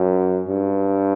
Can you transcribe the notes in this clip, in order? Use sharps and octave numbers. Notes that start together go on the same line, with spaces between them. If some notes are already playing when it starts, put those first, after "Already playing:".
Already playing: F#2
G2